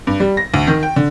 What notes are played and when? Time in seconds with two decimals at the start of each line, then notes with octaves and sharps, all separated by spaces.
0.07 G2
0.20 G3
0.37 A#6
0.54 D2
0.67 D#3
0.83 G5
0.96 D3